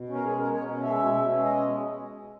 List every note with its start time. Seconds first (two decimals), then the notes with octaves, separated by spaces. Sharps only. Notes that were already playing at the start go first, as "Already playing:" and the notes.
Already playing: B2
0.09 C#4
0.15 A#4
0.24 G#3 G#4
0.39 B2 A#4
0.53 B2 C#5
0.68 C#4
0.83 G#3 E5
0.98 B2
1.13 B2
1.29 C#4
1.43 G#3 D#5
1.59 B2